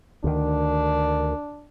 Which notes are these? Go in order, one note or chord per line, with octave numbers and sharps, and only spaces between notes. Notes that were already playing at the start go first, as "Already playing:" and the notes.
D2 D#3 D4